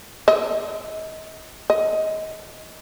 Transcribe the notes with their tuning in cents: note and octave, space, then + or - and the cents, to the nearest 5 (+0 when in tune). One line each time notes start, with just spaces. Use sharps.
D#5 +30
D#5 +20